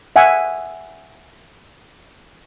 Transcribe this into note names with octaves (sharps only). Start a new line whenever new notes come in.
E5 F#5 G#5